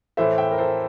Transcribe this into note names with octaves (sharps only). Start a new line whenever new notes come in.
A2 E3 A3 C5 E5
E5 G5
A#4
A4 C5